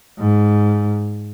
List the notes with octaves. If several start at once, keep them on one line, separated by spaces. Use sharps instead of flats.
G#2